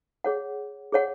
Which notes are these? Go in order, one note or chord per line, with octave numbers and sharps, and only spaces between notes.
G#4 C#5 F#5
G#4 C#5 F#5